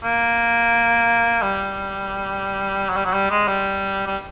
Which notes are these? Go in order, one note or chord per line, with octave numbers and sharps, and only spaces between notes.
A#3
G3
F#3
G3
F#3
G3
G#3
G3
G3